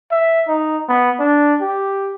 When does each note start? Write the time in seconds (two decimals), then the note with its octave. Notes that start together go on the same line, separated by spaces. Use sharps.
0.11 E5
0.48 D#4
0.89 B3
1.20 D4
1.61 G4